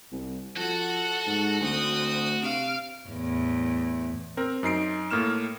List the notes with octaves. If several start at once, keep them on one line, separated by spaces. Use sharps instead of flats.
C2
F3 F#4 A4 F#5
G#2
D2 C4 D#6
C3 F5 D7
E2 A2
C4 A#4
F#2 D#4 C7 D7
A2 A#3 F6 E7